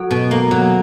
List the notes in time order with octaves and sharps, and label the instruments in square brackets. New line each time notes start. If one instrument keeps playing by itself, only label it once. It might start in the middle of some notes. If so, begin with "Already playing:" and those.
Already playing: [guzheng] F#3 [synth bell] A4
[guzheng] B2
A#3
F#3